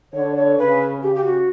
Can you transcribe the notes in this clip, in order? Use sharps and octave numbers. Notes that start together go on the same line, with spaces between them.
D3 C#5
C#5
C#3 B4
C#3 G4
G4
F#4